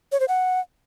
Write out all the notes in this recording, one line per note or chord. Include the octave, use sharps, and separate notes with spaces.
C#5
C5
F#5